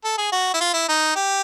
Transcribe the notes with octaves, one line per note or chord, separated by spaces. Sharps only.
A4
G#4
F#4
E4
F4
E4
D#4
G4